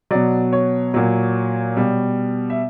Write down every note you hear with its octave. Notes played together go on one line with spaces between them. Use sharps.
B2 F#3 D5
C#5
A#2 F#3
B2 G3
E5